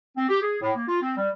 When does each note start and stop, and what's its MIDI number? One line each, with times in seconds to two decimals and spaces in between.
0.16 0.25 60
0.29 0.39 67
0.41 0.56 68
0.62 0.70 45
0.76 0.87 58
0.87 0.97 65
1.01 1.13 60
1.16 1.29 55